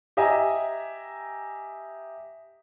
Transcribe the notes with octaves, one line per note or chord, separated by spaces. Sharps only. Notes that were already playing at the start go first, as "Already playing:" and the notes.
G4 D#5 E5 G#5 A#5